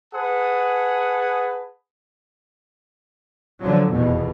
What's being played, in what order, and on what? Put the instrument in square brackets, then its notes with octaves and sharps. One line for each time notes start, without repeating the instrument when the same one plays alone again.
[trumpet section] G#4 B4 F#5 A5 D#6
[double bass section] D3 F3 F#3
F1 E2 B2